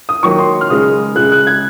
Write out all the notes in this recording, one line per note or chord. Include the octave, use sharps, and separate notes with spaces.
D#6
D#3 F#3 A#3 C#6
C6
F6
C#3 G#3 D#6
C#3 G#3 F#6
F#6
G#6